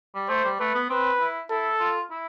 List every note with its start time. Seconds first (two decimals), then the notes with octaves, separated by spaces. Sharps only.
0.15 G3
0.29 A3 C5
0.45 G3
0.60 A3 B4
0.75 B3
0.89 C4 B4
1.20 E4
1.51 E4 A4
1.80 F4
2.11 E4